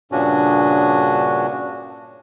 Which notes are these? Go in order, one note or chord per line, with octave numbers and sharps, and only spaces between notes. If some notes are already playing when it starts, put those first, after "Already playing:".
G2 A#2 C#3 C#4 D4 F#4